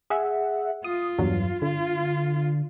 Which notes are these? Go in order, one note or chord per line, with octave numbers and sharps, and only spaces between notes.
G#4 E5 F#5
F4 D#6
E2 G2 F#3
D3 F4